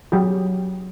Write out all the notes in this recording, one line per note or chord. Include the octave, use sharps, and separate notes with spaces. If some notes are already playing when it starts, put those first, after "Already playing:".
F#3 G4 G#4